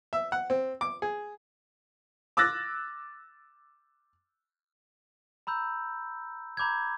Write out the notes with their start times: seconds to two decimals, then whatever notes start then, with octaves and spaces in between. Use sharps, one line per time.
0.13 E5
0.32 F#5
0.50 C4
0.81 D6
1.02 G#4
2.37 D6 E6 F#6 A6 A#6
5.47 A#5 B5 E6 G6
6.57 A#5 B5 D6 G6 G#6